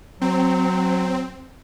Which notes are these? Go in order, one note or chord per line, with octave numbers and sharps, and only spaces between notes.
F#3 C4